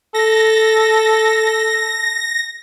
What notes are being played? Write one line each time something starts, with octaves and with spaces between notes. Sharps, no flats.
A4 A#6